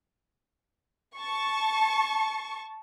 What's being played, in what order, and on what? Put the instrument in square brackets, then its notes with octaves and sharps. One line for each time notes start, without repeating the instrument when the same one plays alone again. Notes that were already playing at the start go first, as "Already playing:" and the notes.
[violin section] A5 C#6